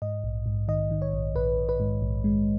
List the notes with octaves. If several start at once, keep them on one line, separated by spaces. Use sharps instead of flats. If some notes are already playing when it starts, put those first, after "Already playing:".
G#2 D#5
A#1
G#2
D#3 D#5
D#3
C#5
A#1
A#1 B4
A#1
B4
G#2
A#1
G#3